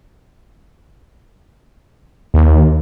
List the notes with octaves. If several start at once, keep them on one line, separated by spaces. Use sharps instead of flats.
D#2